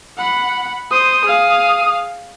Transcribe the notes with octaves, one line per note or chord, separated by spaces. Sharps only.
F#5 B5
C5 D#6
G#4 F5